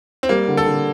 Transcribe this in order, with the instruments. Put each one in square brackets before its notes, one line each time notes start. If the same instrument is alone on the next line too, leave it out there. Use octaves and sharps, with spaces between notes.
[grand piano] C4
[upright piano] G3 [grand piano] A#3
[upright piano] D3
[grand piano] A4
[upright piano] D3